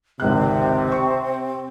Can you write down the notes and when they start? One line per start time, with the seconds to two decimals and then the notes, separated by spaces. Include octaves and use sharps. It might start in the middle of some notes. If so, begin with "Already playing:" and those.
0.20 G#1 C#2 C3 C4 F#6
0.92 C#6